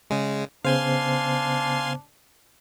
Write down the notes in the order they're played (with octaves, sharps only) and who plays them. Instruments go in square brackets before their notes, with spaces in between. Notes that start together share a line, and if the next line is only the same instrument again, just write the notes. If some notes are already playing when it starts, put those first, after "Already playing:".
[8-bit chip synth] C#3 G#3
[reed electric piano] C#3 B3 C5 [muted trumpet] D4 [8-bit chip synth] F5 G#5 C6